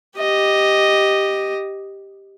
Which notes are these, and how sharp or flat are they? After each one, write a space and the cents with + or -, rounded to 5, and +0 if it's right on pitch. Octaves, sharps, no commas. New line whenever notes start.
G4 +0 D#5 +0